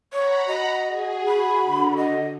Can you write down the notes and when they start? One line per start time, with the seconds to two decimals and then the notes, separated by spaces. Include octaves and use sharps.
0.13 C#5 F#5 A#5 B5
0.48 F#4 D#5
0.87 G#4
1.27 B5
1.61 D3
1.97 D#5